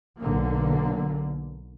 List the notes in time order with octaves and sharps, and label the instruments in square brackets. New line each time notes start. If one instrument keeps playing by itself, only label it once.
[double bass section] B1 D3 A#3